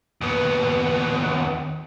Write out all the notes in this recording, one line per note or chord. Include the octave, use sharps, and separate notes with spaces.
D#2 B3